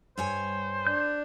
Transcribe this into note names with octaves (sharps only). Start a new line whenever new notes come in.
G2 C5 C#5 G#5
D4 G6